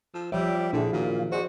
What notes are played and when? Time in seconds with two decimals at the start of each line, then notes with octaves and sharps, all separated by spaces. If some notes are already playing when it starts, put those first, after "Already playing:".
0.14 F3 E6
0.32 F3 G3 C#5 D5 E5 D6
0.73 A#2 D3 D4 E4 G#4
0.93 A#2 D#3 F#4 F5
1.32 F#4 G#4 C5 D5 D#5